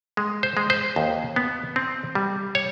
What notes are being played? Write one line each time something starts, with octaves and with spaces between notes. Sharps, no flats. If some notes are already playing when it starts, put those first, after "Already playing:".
G#3
C5
G#3
C5
D#2
B3
C4
G3
C#5